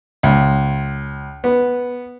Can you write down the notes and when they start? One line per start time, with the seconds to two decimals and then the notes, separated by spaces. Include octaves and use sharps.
0.23 C#2
1.44 B3